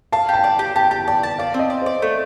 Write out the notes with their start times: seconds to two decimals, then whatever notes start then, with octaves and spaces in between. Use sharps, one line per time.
0.12 F5 A5
0.29 G4 A5
0.44 D5
0.59 G4
0.76 G4 A5
0.91 G4 A5
1.08 D5 A5
1.23 A5
1.39 D5 F5
1.54 C4
1.59 D#5
1.70 D5
1.82 C5 D5
2.02 A3